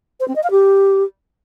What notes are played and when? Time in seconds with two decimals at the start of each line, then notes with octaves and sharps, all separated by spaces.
0.20 C5
0.28 C4
0.35 D#5
0.43 F5
0.51 G4